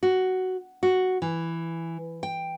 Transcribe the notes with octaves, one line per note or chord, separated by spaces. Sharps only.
F#4
F#4
E3
G5